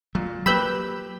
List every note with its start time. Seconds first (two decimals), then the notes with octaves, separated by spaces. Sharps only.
0.15 A#2 F#3
0.46 F#3 A#3 G4 B4 B5 E6 G6